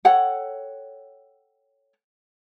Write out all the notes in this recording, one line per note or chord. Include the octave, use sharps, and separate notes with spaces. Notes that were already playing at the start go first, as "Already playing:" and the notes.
A4 C#5 F#5 G5